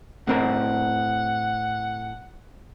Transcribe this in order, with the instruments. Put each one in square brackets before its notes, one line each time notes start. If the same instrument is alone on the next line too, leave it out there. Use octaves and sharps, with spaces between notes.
[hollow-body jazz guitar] A2 C4 A#4 [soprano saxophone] F#5